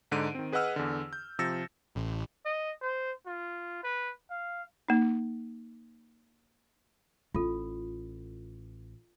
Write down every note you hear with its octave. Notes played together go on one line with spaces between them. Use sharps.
G#2 D3 D#4 D7 D#7
D#3 C4
G#4 B4 D#5 F#5 E6 F6
E2 D3
G6
C3 F3 E6 A6 A#6 C#7
A1
D#5
C5
F4
B4
F5
A#3 D#4
A1 F4 A4